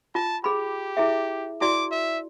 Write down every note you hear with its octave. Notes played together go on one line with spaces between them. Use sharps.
F4 A5
G4 G#4 B5
E4 G#4 E5
E4 F#4 D5 D6
E5